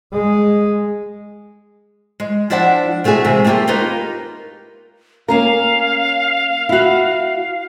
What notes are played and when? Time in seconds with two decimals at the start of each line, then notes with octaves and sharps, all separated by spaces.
0.13 G#3
2.20 G#3
2.50 F3 D4 E4 D5 F#5 A5
3.04 C3 A3 F4 F#4 G#4
3.24 C3 E3 G#3
3.45 A3 A#3 D4 F4 G4
3.67 A#3 D#4 F4 A#4 B4
5.28 A#3 C#4 A#4 F5
6.69 E4 F#4